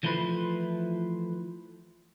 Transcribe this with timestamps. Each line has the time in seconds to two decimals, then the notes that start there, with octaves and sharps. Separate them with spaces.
0.03 E3 F3 A3 E4 B4 C5